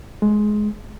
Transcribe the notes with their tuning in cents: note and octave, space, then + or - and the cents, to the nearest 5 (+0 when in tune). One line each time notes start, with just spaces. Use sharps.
G#3 +15